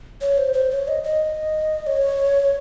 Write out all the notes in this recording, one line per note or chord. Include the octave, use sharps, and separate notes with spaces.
C#5
C5
C5
C#5
D#5
D#5
C#5